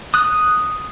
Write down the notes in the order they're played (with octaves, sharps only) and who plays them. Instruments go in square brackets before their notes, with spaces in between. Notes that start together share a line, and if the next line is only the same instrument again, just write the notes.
[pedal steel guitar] D#6 F#6